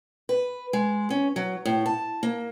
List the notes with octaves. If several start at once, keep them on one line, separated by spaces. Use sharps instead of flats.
B4
G#3
C#4
F#3
A2
A5
A#3